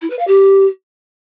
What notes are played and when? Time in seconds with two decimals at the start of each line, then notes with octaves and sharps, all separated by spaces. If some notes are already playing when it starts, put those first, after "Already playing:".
0.02 E4
0.10 B4
0.19 F5
0.27 G4